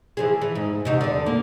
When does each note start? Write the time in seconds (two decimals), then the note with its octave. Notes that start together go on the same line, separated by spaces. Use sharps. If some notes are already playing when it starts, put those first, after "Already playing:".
0.17 E3 F3 G#4
0.42 E3
0.55 G#2
0.85 C3 D#4 F#4
1.01 E2 D3
1.26 A#3